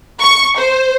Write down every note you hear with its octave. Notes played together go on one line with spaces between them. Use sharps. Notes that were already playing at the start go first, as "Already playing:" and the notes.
C#6
C5